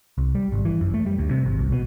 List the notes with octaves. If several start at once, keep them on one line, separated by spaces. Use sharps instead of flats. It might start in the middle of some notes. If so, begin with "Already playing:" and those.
C2
G3
G#1
E3
F#2
A3
G3
D2
C3
G#1
C2
B2